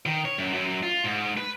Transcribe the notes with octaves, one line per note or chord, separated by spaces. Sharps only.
D#3
C#5
F#2
F#2
F4
G#2
B4